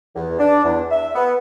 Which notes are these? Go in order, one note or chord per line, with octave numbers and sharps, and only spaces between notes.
E2
D4
E2
E5
B3